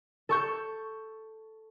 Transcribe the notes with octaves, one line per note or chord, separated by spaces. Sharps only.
A4 C#6 G6